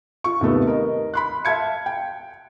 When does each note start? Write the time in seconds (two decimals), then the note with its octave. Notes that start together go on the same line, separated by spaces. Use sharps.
0.24 F4 C#6
0.41 D#2 C3 A3 B3
0.67 A#4 D#5
1.14 B5 C6 F#6
1.45 E5 F5 A5 G#6 C#7
1.86 G5